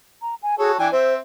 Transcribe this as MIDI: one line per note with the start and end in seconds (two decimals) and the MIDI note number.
0.22 0.35 82
0.43 0.55 80
0.59 0.79 66
0.59 0.72 68
0.59 0.79 69
0.59 0.79 73
0.79 0.89 52
0.79 0.89 62
0.79 0.87 79
0.79 0.89 80
0.92 1.18 60
0.92 1.14 72
0.92 1.18 76